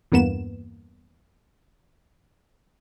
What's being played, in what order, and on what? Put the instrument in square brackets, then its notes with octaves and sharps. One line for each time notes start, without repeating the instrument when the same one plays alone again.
[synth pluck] E2 G2 A#3 B3 E7